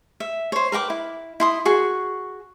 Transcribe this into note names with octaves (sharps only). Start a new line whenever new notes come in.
E5
C5 C#5
A#4 B4 G5 D6
E4
E4 C6 D#6
F#4 G#4 C#6